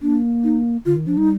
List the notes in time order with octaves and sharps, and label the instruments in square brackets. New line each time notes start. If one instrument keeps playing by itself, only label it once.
[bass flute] A#3 [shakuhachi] D4
[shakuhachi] D#4
[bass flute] D3 [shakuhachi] F4
[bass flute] D#3
[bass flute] F3 [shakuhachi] D4
[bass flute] G3 [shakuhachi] D#4